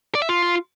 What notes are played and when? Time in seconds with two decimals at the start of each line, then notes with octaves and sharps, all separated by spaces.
0.15 D5
0.22 E5
0.29 F4